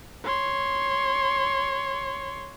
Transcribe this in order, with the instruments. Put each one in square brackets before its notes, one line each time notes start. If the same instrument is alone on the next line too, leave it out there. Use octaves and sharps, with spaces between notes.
[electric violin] C#5 C6